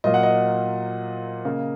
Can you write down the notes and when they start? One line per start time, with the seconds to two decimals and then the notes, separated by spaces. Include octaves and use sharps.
0.04 A#2 F#3 A#3 D#5
0.14 F#5
0.23 D#5
1.45 C#3 A#3